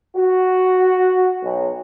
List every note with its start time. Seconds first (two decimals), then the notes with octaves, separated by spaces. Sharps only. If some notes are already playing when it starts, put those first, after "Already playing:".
0.16 F#4
1.43 B1